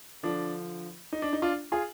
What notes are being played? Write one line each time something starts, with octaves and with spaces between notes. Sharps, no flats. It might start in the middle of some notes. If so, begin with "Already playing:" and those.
D3 F3 D4
D#4
D4
D#4
D4 F4
F4 G#4